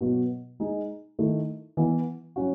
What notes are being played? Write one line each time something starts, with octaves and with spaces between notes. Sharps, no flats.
B2 F#3 B3 F#4
G#3 D#4 G#4
D#3 A3 E4
E3 B3 E4
F#3 C#4 F#4